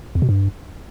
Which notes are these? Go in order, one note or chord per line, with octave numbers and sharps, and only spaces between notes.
E2
B2
G2